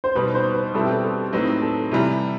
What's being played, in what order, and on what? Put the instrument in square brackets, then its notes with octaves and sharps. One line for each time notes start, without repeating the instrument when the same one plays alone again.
[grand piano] C5
[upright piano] B2 G3 D#4 [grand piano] B4
[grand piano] C5
B4
[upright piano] B2 G3 C4 E4 [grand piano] A4
[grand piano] G4
A4
A4
[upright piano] A2 F#3 C4 D#4 [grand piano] B4
[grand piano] A4
[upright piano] C3 E3 G3